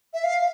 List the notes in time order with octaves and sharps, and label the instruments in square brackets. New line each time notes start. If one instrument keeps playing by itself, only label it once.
[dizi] E5
F5